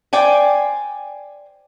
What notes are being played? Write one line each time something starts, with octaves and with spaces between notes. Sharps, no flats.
C5 D5 G5 G#5